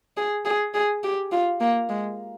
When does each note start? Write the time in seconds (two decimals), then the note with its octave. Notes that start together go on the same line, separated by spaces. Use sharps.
0.17 G#4
0.45 G#4
0.74 G#4
1.03 G4
1.31 F4
1.61 A#3
1.89 G#3